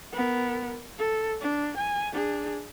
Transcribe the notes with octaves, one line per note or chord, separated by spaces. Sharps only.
B3 A#4
A4
D4
G#5
D4 G#4